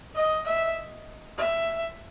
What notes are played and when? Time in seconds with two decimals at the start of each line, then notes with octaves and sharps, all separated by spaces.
0.15 D#5
0.46 E5
1.38 E5